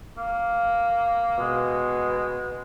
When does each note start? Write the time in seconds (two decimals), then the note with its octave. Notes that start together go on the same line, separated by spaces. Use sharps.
0.17 A#3
1.39 B2 G#3